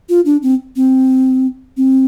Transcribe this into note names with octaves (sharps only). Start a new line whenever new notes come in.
F4
D4
C4
C4
C4